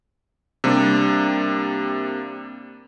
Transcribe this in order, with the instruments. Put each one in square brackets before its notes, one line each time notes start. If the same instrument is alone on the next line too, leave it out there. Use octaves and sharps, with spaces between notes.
[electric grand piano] C3 G3 A#3 D4